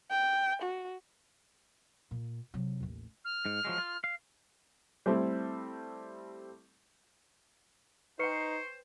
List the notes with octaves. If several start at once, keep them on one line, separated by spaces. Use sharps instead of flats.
G5
F#4
A#2
C3 F#3
A1 D#2
F6
G#2
F3 F#3 G#3
F4
F5
G3 A3 C4 E4 A4
D#4 B4 C5 G5 C#6 C7 C#7